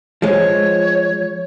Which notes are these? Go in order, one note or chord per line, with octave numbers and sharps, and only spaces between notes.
F3 G#3 C#5